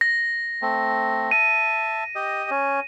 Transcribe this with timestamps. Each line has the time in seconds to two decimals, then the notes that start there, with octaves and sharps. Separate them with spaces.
0.01 A#6
0.62 A3 C4
1.31 E5 A5 D#7
2.15 G4 D#5
2.51 C#4